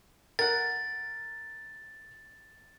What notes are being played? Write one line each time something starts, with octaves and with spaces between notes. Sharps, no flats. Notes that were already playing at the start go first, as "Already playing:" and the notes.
A#4 F#5 A6